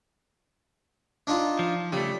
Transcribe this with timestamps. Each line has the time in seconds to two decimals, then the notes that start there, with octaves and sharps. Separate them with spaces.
1.27 D4 D#4 F4
1.59 F3
1.92 C#3 G3 A3